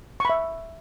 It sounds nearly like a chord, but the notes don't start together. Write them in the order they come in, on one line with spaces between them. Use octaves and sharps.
C#6 B5 E5